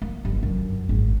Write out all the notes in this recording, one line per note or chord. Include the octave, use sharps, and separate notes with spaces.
A#3
G1
F#2
G#1